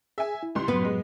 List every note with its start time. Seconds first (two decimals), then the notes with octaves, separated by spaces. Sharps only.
0.18 G#4 E5 G#5
0.43 E4
0.55 C#2 G3 C6
0.68 F#2 A2 F#3 B3 B4
0.84 G#3